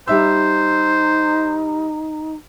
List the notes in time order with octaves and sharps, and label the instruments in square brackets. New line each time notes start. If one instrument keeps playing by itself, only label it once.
[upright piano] G3 E5 E6 [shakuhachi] D#4 [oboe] C5